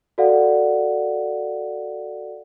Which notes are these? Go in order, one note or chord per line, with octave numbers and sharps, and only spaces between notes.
F#4 A4 D5 F5 F#5